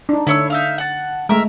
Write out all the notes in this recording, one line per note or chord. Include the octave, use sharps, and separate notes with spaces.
D4 D#4
D3 E4 C#5 E6
D#4 E5 F5
F#5 A5
G#3 A3 A#4 E5